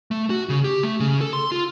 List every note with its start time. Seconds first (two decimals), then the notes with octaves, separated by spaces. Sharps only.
0.11 A3
0.30 F#4
0.49 C#3
0.64 G4
0.83 A3
1.00 C#3
1.21 A4
1.33 C6
1.52 F4